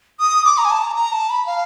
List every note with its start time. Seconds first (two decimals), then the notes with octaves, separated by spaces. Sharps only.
0.20 D#6
0.45 D6
0.58 A#5
0.65 G#5
0.71 A5
0.83 A#5
0.96 A#5
1.12 A5
1.30 B5
1.46 F5